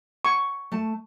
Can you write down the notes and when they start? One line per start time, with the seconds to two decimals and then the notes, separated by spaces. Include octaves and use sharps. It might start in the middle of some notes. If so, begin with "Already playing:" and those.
0.25 C#6
0.72 A3 A5